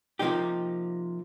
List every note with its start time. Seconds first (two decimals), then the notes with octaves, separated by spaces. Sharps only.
0.19 C3 F3 A#3 D#4 G4